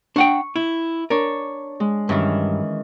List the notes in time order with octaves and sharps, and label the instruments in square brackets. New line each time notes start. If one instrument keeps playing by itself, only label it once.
[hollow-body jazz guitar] D4 F#5 G5 [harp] C#6
[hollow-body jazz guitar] E4
[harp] D4 C#5 [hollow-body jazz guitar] A#4
[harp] G#3
[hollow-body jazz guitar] G2 [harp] D#3 E3 C#4